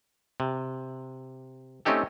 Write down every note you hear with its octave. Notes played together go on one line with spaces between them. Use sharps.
C3
A3 C4 C#4 D#4 G4 A4